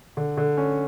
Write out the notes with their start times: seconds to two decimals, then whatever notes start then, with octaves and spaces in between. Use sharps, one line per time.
0.17 D3
0.37 D3
0.58 C#4